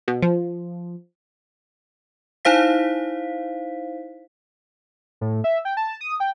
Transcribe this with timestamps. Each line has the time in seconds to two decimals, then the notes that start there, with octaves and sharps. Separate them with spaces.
0.08 B2
0.22 F3
2.45 D#4 E4 C5 F5 B6
5.21 A2
5.44 E5
5.65 G5
5.77 A5
6.01 D#6
6.20 G5